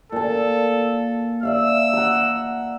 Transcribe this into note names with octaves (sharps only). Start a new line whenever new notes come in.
A#2 A4 A5
D5 E5 F5 E6
F#5 A#5